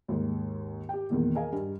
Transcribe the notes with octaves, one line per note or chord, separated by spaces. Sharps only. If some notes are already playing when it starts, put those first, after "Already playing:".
D#2 G#2
G4 G5
E2 A#2 D#3
G#4 A#4 D#5 F5 G#5
G2